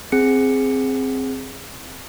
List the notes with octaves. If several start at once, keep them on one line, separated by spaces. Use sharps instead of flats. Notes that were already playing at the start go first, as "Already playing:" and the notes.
C4 G#4 C#7